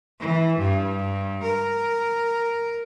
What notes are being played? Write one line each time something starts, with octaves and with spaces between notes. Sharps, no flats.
E3
G2
A#4